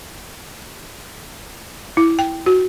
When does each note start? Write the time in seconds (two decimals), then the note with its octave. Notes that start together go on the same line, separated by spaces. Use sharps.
1.97 E4
2.19 G5
2.46 F#4